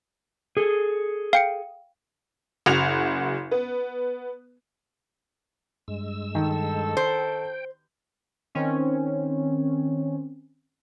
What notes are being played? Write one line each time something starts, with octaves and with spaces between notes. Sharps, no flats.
G#4 A4
F5 G5 C#7
F#1 F#4 F7
B3
G2 G#3 E6
D#3 A4
C5 G5
D#3 C4 C#4